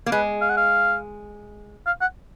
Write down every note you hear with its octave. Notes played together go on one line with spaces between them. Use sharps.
A#3
G#3 B4
F5
F#5
F5
F5
F#5